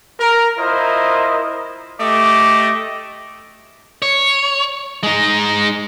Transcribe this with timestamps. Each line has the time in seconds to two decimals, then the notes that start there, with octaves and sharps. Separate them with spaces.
0.20 A#4
0.58 E4 F4 A#4 C5 D#5
2.00 A3 G4 D#5 D6
4.02 C#5
5.03 G#3 D#4